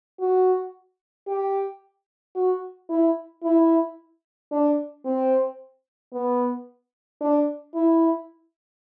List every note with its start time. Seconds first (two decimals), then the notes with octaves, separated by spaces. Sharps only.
0.20 F#4
1.28 G4
2.35 F#4
2.90 E4
3.43 E4
4.52 D4
5.05 C4
6.12 B3
7.21 D4
7.74 E4